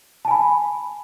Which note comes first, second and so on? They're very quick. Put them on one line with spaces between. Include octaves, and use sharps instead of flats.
A5 G#5 B5